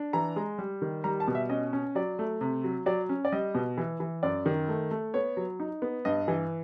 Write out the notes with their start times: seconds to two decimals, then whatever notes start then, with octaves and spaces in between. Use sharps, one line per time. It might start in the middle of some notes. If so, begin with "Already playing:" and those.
Already playing: D4
0.13 E3 A#5
0.36 G#3
0.58 G3
0.82 D#3
1.04 G3 A#5
1.20 A5
1.28 B2
1.35 E5
1.50 C#4 D#5
1.73 C#4
1.95 F#3 D5
2.19 A3
2.41 C3
2.64 F#3
2.86 F#3 D5
3.09 C#4
3.25 D5
3.32 G3 D#5
3.55 B2
3.78 E3
4.00 E3
4.23 F#2 D5
4.46 D#3
4.68 A3
4.91 A3
5.14 B3 C#5
5.37 F#3
5.60 D#4
5.82 B3
6.05 G2 D#5
6.28 E3